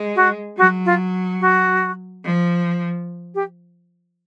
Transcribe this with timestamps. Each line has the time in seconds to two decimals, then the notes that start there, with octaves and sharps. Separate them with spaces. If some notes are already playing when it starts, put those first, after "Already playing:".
Already playing: G#3
0.16 F#4
0.57 F#3 F#4
0.85 F4
1.41 F#4
2.24 F3
3.35 G4